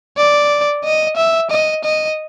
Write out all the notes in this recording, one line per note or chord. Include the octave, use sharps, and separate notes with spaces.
D5
D#5
E5
D#5
D#5